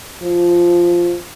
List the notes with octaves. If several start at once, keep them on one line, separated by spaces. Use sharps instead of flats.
F3